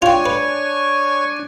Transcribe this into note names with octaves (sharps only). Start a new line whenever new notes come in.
D4 F4 C#5 G5 G#5 C#6
B4